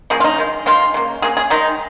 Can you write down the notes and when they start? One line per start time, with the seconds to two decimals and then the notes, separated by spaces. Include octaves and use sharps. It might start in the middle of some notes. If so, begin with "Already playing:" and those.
0.10 C#3 F3 A#3 G#4
0.20 F4
0.24 D#4
0.38 D#3 G#3
0.66 D#3 G#3 F4
0.94 C#3 A#3
1.22 C#3 A#3 G#4
1.37 G#4
1.50 D#3 G#3 D#4